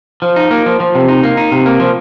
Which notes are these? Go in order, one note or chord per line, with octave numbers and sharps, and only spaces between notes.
F3
D#4
A#3
F3
F3
C3
D#4
A#3
D#4
C3
A#3
F3